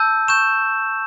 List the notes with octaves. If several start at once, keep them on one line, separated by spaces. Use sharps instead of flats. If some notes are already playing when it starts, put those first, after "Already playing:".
Already playing: A5 E6 G6
C#6 G6 E7